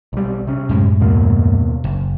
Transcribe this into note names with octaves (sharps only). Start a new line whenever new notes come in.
B1 G3
C3 C#4
F#2 A2 G#3
D#2 B2 A#3
F#1